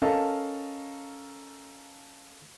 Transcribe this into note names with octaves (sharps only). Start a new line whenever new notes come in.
C#4 A4 A#4 D#5 F5 A5